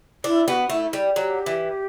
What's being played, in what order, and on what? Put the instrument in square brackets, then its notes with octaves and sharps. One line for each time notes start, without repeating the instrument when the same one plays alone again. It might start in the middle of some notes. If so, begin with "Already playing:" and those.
[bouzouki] D4 [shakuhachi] E4
[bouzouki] B3 [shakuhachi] G4
[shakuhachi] F#4
[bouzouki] A3 [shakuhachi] E4
[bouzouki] G3
[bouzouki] F#3 [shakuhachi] G4
[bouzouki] E3